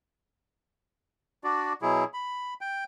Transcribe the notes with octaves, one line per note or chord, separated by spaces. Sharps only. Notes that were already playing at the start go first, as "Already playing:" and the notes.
D4 F#4 D5
B2 F#3 E4 G#4
B5
G5